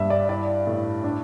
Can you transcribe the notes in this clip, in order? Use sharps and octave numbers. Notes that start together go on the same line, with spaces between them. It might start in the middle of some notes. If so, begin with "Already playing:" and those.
Already playing: G2 G3 E5
D5
E4 D5
A2
D4